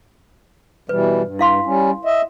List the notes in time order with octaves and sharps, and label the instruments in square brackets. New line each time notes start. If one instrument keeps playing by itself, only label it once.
[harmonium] B2 E3 G3 [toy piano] B4
[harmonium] G2
[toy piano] E4 F5 C6
[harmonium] G3 C#4
D#5 E5